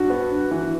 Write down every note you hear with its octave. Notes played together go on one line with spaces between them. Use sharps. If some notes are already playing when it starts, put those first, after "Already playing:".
Already playing: G2 F#4
B3
G2
E3